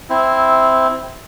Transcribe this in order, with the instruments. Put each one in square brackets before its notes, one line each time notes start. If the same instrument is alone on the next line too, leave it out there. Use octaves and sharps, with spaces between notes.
[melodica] C4 E4